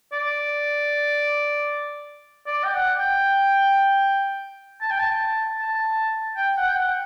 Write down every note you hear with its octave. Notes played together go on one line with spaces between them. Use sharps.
D5
D5
G5
F#5
G5
A5
G5
A5
A5
G5
F#5
G5
F#5